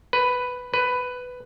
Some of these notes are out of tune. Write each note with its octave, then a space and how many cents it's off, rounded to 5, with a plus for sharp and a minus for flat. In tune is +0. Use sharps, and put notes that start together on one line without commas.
B4 +5
B4 +10